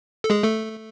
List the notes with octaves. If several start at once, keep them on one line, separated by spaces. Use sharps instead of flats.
A4
G#3 G#4
A3 A4